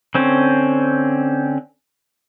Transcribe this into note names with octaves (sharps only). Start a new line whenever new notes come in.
D3 C4 C#4